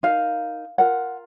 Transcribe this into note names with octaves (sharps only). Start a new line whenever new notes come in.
D#4 A#4 F5
F4 A#4 F#5